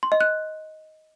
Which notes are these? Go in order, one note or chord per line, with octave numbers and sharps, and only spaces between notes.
C6
D#5
F#6